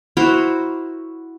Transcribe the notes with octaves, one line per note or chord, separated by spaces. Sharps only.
E4 F#4 A#4 C5